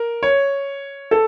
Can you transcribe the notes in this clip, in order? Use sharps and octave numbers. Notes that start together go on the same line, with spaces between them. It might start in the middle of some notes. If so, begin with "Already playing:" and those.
Already playing: A#4
C#5
A4